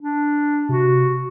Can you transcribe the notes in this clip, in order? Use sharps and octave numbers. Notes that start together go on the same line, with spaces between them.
D4
C3 F#4